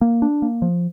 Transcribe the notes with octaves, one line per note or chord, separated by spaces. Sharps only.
A#3
D4
A#3
F3